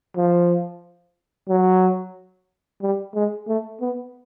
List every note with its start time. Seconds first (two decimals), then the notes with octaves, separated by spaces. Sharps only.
0.17 F3
1.49 F#3
2.82 G3
3.15 G#3
3.48 A3
3.81 B3